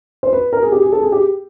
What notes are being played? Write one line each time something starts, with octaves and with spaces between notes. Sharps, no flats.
C5
B4
A#4
G#4
G4
G#4
A4
G#4
G4